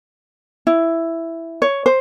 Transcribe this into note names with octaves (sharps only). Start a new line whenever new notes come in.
E4
C#5
C5